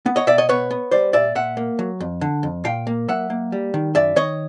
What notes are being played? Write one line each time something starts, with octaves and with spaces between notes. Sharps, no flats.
B3
C#5 D#5
B2 D5 E5
C#5 D#5
B3 B4 C#5
B3
G3 C5 D5
A#2 D5 E5
A#2 E5 F#5
A#3
F#3
F2
D3
F2
A#2 F5 G5
A#3
F#3 E5 F#5
A#3
G3
D#3
F#2 D5 E5
D#3 C#5 D#5